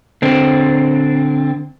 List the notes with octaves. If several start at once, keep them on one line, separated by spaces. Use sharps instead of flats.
D3 C4